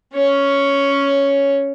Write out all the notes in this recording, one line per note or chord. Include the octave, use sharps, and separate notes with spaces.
C#4 C#5